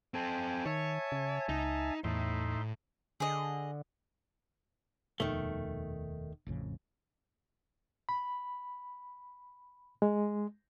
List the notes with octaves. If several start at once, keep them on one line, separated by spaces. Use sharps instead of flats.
C4 A4 G5 G#5
D#3 C#5 E5 G#5 A5
C#3
C#2 D#4
E2 A2 D#4 E5 C6
D3 G#4 D#5
D#1 F2 B2 D#3 A3
A1 F2 C#3
B5
G#3